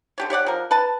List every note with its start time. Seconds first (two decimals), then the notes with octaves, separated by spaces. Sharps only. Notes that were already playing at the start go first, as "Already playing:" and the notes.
0.18 D3 G4 C#5
0.30 G4 C#5 D5 F#5
0.46 F3 A#4
0.71 B4 A5